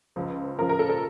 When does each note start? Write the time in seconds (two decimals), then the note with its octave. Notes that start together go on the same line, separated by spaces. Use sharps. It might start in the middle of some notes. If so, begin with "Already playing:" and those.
0.16 C#2 C#3 F3
0.58 C#2 C#3 F3 A#4
0.69 A#4
0.79 A4
0.89 A4